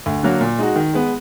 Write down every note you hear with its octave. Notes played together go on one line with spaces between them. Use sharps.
D2
D3 F#3 A#3
A#2
G#3 D#4 F#4
D#3
G#3 B3